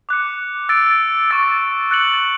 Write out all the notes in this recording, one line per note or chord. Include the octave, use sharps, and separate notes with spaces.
D6 F#6 C#7
E6 A6 D7
C#6 E6 A6
F#6 A6 C#7 F#7